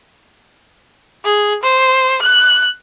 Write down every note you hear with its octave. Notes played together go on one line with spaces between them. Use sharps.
G#4
C5
F#6